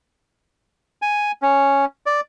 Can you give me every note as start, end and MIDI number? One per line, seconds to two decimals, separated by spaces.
1.02 1.32 80
1.42 1.85 61
2.06 2.21 74